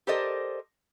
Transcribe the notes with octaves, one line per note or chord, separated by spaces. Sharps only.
G4 A4 A#4 C5 D5 D#5